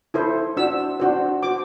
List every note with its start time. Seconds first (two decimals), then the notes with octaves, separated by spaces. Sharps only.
0.14 E4 A4 C5
0.57 D4 F#4 C5 E6
1.00 D4 F#4 C5
1.43 F#4 C5 D6